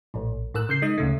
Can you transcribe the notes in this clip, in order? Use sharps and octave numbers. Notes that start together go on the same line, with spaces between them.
A#1 A2
A2 A#4 E6 F#6
C#3 G6 C7
G#3 D#4 D#6
D2 C#3 A3